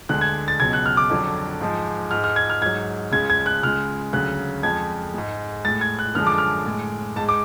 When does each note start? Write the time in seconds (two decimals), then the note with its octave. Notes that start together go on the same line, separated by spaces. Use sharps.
0.09 D2 D3 G#3 F#6
0.21 G#6
0.48 A6
0.60 C#2 B2 F#3 G#6
0.73 F#6
0.86 F6
0.97 D6
1.10 F2 D3 F#3
1.60 G#2 F3 G#3
2.11 G#2 G#3 F6
2.24 F6
2.36 G#6
2.50 F6
2.61 G#2 F#3 G#6
3.12 C#2 C#3 G#3 G#6
3.30 G#6
3.46 F#6
3.63 C#2 C#3 G#3 F6
4.13 D2 C#3 F#3 F#6
4.63 F2 F3 G#3 G#6
5.14 G#2 G#3
5.65 A2 G#3 A6
5.81 G#6
5.99 F#6
6.15 F#2 D3 F3 G#3 F6
6.27 D6
6.38 F6
6.66 A2 G#3
7.16 G#2 G#3 A5
7.29 D6